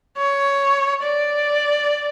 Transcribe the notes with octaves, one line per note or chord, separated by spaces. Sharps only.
C#5
D5